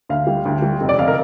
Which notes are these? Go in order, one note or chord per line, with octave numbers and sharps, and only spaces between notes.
D2 F5
G3
D2
G3
F1
D5
F1 F5
A#4